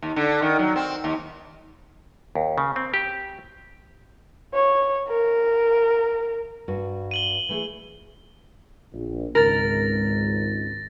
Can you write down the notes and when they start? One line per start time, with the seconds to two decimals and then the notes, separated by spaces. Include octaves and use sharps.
0.03 D#2
0.16 D3
0.42 D#3
0.59 F#3
0.76 C4
1.04 D#2
2.35 D#2
2.58 C#3
2.76 C4
2.94 G4
4.54 C#5
5.08 A#4
6.68 G2 F#4
7.11 D#7 F#7 G7
7.49 E3 A3 G#4
8.93 A#1
9.35 G#1 C#2 G#2 A#4 A6 A#6